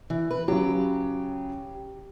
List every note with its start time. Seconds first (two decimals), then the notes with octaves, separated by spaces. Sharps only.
0.10 E3
0.31 B4
0.48 C#3 F#3 G4